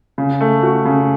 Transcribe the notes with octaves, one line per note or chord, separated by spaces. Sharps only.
C#3
A3
F#4
C#3